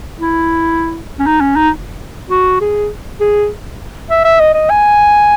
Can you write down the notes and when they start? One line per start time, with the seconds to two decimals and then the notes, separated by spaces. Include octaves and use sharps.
0.21 E4
1.20 C#4
1.26 D#4
1.41 C#4
1.56 D#4
2.30 F#4
2.61 G#4
3.21 G#4
4.11 E5
4.25 E5
4.40 D#5
4.54 D#5
4.70 G#5